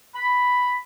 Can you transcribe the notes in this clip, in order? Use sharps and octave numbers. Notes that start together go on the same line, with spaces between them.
B5